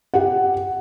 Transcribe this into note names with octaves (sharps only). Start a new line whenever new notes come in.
G4 F#5